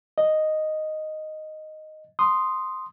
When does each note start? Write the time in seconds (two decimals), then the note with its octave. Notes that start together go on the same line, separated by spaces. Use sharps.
0.18 D#5
2.19 C6 D#6